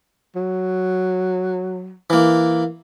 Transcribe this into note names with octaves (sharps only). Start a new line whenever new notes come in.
F#3
E3 A#3